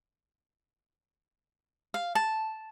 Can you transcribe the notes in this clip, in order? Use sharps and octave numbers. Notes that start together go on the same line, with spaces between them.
F5
A5